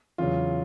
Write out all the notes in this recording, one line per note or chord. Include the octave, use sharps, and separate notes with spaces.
E2 C#3 F#3 F4